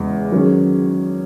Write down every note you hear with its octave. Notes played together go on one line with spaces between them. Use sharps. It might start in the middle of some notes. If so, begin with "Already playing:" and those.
Already playing: E2 C#3 G#3 C#4 G#4
D#3 F#3 C#4 G#4